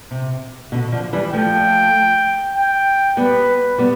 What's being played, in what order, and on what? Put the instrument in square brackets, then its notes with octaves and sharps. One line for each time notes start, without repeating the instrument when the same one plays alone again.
[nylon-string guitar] C3
B2 D3
D3 F3
E3 G3
[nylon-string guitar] F3 A3 [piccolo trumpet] G5
[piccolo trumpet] G5
[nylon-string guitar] G3 B3 [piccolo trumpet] B4
[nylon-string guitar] G3 B3